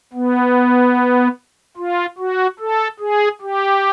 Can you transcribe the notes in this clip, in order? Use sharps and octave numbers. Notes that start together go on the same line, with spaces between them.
B3
F4
F#4
A4
G#4
G4